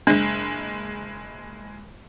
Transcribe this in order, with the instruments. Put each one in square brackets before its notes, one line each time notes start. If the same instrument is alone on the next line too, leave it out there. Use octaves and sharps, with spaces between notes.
[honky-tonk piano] F#1 G#3 [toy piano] D4 C5